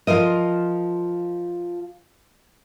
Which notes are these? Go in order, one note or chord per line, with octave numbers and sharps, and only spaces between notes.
F3 F4 A#4 D#5